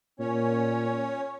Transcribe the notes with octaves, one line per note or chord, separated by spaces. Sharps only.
A#2 C#4 C#5